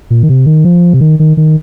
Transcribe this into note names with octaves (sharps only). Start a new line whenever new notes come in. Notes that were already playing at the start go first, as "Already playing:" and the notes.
A#2
D#3
C3
D#3
F3
C3
D#3
D#3
D#3